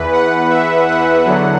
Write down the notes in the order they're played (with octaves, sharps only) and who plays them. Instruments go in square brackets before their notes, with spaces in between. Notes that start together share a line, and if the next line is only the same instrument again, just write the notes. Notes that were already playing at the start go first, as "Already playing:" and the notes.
Already playing: [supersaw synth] E2 E3 B4
F#5
E5
F#5
E2 D3 F#3